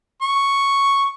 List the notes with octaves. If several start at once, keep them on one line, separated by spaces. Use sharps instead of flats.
C#6